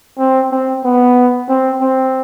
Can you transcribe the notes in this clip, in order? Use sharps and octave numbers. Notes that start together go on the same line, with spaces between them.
C4
C4
B3
C4
C4